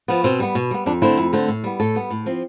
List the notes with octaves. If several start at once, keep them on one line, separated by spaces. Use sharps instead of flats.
F3 B3
B2 C4
G3 B3
B2
G3 B3
F2 D4
D3 A3 C4 E4
F2
D3 A3 C4
A2
G3 B3
A2 A4
G3 B3
A2
F3 C4